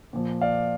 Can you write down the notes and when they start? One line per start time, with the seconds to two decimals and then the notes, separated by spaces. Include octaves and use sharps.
0.13 A#2 F3
0.41 D5 F5